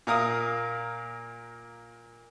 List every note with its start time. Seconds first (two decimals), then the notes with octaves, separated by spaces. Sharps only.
0.07 A#2 A#4 F5 D#6